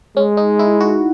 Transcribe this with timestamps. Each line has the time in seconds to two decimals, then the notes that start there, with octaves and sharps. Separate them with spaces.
0.16 G#3 C#4
0.37 D#4
0.59 E4
0.81 F#4